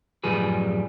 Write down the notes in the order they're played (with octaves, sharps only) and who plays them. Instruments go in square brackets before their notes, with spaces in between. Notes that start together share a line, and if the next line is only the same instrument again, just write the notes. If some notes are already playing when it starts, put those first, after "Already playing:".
[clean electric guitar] F#2 A2 F3 G3 G#4 B4